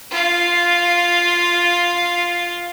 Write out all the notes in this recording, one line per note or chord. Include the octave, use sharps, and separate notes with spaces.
F4 F5